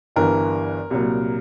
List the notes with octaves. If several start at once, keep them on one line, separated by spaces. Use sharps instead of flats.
G1 G2 E3 A#4
C2 A#2 F#3